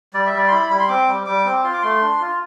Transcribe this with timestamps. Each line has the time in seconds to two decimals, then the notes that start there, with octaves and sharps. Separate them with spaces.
0.14 G3 D5
0.26 E5
0.33 G3 D5
0.48 C6
0.52 E4 B5
0.70 G3 B5
0.80 C6
0.89 C4 D6
1.08 G3
1.26 G3 D6
1.45 C4
1.64 F4 C6
1.73 D6
1.83 A3 C6
2.02 D4
2.21 F4